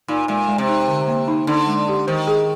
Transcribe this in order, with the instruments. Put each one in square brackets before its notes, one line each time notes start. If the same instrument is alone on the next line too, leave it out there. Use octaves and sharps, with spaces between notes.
[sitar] A#2 [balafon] D#4
[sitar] A#2 [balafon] G#3
[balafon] G#3
[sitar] C3
[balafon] D#4
D3
A#3
D#4
[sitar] D3 [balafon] D#4
[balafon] G#3
G4
[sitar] D#3 [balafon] C5
[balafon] G#4